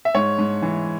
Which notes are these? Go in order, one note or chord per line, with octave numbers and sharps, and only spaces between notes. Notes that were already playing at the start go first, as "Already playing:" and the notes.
E5
G#2 C#5
G#2
E3